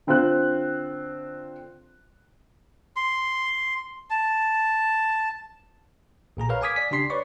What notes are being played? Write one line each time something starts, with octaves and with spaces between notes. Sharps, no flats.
D3 C4 F4 C5 F#6
C6
A5
B1 A#2 G#4 A#5
A#4 B4 C#5 F5 F6
F5 G#5 D6 D#6 G#6 B6
D5 B6
C#3 D4 G4 C6 B6 C7
B4 C#5 D5 C#6